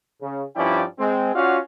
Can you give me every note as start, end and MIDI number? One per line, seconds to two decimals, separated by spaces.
0.21 0.42 49
0.56 0.83 43
0.56 0.83 53
0.56 0.83 61
0.56 0.83 64
0.56 0.83 74
0.56 0.83 79
0.99 1.31 56
0.99 1.31 60
1.34 1.57 61
1.34 1.57 65
1.34 1.57 66
1.34 1.57 74
1.34 1.57 77
1.34 1.57 78